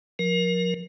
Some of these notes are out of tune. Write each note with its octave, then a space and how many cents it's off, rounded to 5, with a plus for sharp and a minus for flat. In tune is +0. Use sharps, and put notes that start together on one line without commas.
F3 +35 A#4 +20